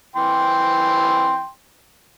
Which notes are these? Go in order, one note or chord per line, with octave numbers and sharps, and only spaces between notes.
E3 G5 C6